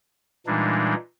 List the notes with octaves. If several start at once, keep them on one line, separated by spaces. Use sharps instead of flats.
A#2 E3 G3 G#3 D4 D#4